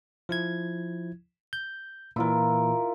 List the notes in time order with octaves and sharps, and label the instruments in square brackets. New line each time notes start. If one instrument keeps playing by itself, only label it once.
[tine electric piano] F3 E4 G#6
G6
[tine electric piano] A#2 E3 [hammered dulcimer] E4 F4 A#4